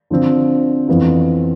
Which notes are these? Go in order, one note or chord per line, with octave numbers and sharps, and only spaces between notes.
D3 F3 C4
F2 E3 B3 F4